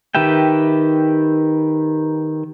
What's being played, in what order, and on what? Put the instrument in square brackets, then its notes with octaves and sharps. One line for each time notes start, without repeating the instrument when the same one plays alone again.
[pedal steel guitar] D#3 G4 B4 E5 G5